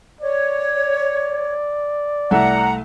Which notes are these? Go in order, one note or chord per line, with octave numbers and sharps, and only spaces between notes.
C#5 D5
C2 A3 E5 F#5 A#5